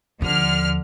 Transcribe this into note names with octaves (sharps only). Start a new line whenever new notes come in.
D#2 D3 F3 F6